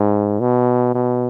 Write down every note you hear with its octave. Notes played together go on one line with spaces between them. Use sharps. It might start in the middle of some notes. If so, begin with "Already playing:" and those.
Already playing: G#2
B2
B2